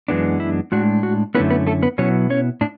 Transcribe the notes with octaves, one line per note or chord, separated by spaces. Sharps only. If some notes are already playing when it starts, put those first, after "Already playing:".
F#2 E3 G#3 B3 D4
E4
A2 G#3 D4 F#4
F#4
F#2 D3 A3 B3 C#4 E4 B4
B3 B4
A3 A4
B3 B4
B2 F#3 B3 C#4 E4 C#5
C#4 C#5
A2 D4